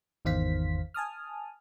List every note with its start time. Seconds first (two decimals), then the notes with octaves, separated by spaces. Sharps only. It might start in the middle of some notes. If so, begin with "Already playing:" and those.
0.25 G#1 E2 D#3 C5 F5 B6
0.94 G#5 A5 D#6 F6